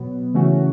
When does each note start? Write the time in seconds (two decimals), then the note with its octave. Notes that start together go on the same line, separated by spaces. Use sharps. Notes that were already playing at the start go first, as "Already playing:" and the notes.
Already playing: B2 F#3 B3
0.34 C#3 E3 A3 C#4 F#4